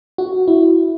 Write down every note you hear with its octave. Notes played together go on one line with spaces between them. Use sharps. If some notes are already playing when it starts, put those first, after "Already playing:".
F#4
E4